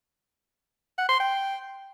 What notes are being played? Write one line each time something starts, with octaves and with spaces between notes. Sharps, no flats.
F#5
C6
G5